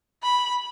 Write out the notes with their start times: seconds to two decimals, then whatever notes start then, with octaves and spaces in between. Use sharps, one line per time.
0.23 B5